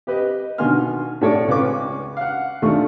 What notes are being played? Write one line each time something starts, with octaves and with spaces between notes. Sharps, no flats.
G4 B4 D#5
B2 D3 D#3 G#5 C6 F6
A2 A4 C#5 D5
C#2 C#4 F4 B4 C#6 D6
F5 F#5
D#2 A3 D4 F4 C#6